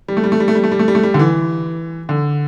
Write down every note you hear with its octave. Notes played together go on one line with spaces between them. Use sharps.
G3
A3
G3
A3
G3
A3
G3
A3
G3
A3
G3
A3
G3
D3
E3
D3